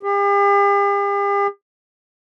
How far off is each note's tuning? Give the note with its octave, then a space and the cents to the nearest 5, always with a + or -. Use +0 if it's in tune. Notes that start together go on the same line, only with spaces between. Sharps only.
G4 +45